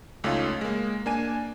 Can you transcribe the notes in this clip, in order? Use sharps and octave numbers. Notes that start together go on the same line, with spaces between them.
C#2 A3 C#4 D#4 F4
G#3 A#3
A#3 D4 G#5 D#7